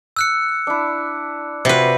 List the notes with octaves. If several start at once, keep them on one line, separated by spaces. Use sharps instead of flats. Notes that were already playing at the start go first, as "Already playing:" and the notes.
E6 F#6 C#7
D4 E4
C3 F4 F#4 B4 B5